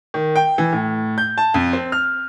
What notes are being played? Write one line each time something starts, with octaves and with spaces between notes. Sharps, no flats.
D#3
G5
E3
A2
G6
A5
F2
C4
F6